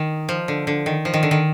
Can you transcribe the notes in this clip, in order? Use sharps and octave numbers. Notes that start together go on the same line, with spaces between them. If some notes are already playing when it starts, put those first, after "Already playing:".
Already playing: D#3
F3
D3
D3
D#3
F3
D#3
D3
D#3